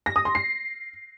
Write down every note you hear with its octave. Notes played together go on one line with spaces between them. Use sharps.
A#6
D#6
C6
C7